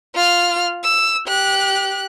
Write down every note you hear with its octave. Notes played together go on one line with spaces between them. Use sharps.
F4 F6
E6
G4 F#6